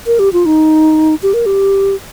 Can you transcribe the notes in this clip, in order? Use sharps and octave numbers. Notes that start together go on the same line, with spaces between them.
A#4
G4
F4
D#4
G4
A#4
G4